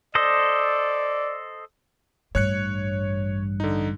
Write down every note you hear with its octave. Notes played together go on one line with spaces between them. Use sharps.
A4 C5 D5 D#5
A1 G2 C#5 F#6 C#7
D3 D#4